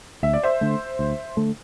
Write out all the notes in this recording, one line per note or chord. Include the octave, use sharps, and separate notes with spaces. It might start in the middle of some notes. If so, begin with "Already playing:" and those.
D2 E5
D5
C5 E5
D3 A3
D2
D3 A3